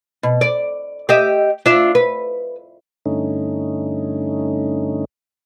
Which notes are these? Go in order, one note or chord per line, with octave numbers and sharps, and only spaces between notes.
B2
D5
G4 D#5 E5
D4 F4 E5
B4
G2 D3 A3 C#4 D#4